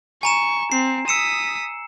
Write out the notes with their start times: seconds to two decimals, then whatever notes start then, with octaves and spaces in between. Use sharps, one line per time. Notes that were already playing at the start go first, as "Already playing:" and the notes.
0.23 G#5 A#5 C#6 E7
0.72 C4 C7
1.08 D#6 E6 B6 C#7 E7